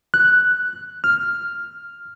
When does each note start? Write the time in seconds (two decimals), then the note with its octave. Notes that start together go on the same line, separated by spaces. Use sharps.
0.14 F#6
1.04 F6